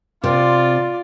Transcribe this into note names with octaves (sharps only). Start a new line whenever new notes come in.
C3 F4 D5